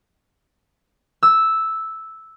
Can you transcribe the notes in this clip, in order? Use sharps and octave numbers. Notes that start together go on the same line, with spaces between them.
E6